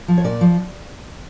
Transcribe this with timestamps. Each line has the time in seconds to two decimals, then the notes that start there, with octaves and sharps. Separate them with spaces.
0.08 F3
0.18 C#5
0.24 A#2 D5
0.41 F3